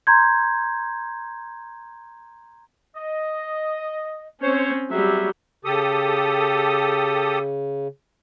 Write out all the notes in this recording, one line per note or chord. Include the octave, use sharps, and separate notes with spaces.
A#5 C6 G6 G#6
D#5
C4 C#4 C5 C#5
F#3 G3 C4 G#4 E5
C#3 G4 A4 D#6